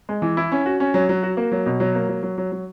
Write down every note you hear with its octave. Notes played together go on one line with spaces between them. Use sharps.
G#3
E3
E4
C#4
F#4
C#4
F#3
F#3
F#4
A#3
F#3
B2
F#3
A#3
F#3
F#3
F#3
F#3